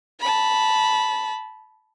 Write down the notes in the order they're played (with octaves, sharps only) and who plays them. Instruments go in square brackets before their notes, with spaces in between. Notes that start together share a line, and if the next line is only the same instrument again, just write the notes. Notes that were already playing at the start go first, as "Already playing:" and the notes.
[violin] A5 B5